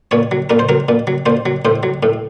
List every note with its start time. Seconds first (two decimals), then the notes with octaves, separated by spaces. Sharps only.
0.11 A#2 C#5
0.31 F#3
0.50 A#2 A#4
0.59 C5
0.69 F#3 A#4
0.89 A#2
1.07 F#3
1.26 A#2 C5
1.46 F#3
1.65 A2 C5
1.83 F#3
2.03 A2